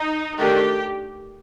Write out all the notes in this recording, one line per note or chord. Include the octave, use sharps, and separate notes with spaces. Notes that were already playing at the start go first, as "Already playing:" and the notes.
Already playing: D#4
D#3 A3 D4 G4